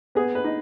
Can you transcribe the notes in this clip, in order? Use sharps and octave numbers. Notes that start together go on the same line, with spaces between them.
B3 G#4
B4
D#4